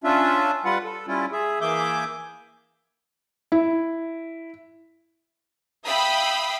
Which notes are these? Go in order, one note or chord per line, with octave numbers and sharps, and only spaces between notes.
C#4 D4 F4 E5
G3 F4 B4 F#5
A4
G3 C#4 E4 F4
G#4 E5
E3 A#3 G#4 E5 D6 G6
E4
E5 F5 G5 B5 D#6